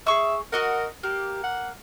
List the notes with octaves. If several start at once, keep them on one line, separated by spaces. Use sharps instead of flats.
G#4 E5 C#6 E6
F#4 A#4 D#5 F#5
A#3 G4
F#5